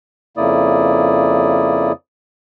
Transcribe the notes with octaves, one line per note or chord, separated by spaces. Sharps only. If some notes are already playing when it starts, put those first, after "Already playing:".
F2 C#3 A#3 E4 D5 D#6